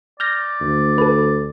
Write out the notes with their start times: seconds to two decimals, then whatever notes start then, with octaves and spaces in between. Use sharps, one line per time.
0.20 D5 F6 G6 A#6
0.61 D2
0.98 A4 B4